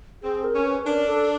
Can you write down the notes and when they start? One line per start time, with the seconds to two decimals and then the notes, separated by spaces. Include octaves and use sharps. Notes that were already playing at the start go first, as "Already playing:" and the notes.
0.23 C4 G#4
0.44 A#4
0.54 C#4
0.65 B4
0.86 D4 A#4
1.08 A4